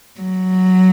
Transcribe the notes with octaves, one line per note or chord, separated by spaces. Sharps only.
F#3